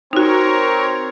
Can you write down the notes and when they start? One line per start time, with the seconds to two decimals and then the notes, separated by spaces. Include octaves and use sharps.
0.13 C4 D#4 F#4 A#4 C#5